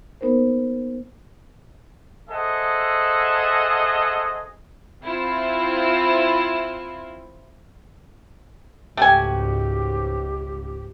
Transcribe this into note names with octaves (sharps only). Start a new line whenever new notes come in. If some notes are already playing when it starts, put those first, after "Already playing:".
A#3 B3 D#4 A#4 C5
G#4 A4 C5 D#5 E5 F#5
C4 E4 F4
C#2 G#2 A3 F#4 G4 G5 G#5